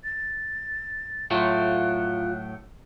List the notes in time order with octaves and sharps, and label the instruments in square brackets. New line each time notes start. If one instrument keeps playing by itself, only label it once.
[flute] A6
[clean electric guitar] A2 F#3 A3 [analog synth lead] F4 [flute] F#6